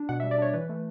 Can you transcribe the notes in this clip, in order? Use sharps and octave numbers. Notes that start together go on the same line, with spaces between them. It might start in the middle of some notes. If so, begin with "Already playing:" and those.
Already playing: D4
B2 F#5
E5
G3
D5
D4 C#5
E3 B4
A3